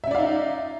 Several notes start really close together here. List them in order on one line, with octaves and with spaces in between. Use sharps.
E5 C#4 D5 F5 D#4